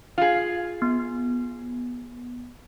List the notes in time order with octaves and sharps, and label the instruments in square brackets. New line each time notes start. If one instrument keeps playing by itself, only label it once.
[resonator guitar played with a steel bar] F4 G#4
[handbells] B3